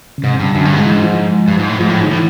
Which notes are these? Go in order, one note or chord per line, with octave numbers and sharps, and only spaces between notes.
C#3
G#2 C3
G2 C#3
F#2 D3
G2
G#2
E3
F3
G2
G#2
A2
G#2 F3
A2
G#2
D#3
A2 E3